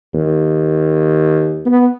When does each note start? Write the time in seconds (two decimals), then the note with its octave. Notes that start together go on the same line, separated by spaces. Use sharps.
0.14 D#2
1.66 B3